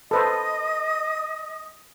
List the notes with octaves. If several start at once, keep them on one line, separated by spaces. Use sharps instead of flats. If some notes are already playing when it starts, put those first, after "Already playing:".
A4 B4 C5 D#5 D#6